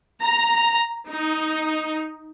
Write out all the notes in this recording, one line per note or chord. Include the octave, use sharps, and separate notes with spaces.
A#5
D#4